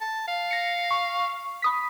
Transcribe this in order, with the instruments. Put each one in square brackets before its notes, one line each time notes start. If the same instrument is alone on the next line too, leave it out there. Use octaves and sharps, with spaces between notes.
[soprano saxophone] A5
F5
[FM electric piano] A#6 C#7
C#6
B5 D#6 B6